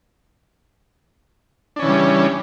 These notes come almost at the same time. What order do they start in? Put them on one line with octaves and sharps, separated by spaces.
D4 C#4 E3 C#3 G3